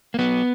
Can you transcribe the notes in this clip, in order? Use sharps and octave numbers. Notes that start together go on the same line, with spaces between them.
A#3
F#3 B3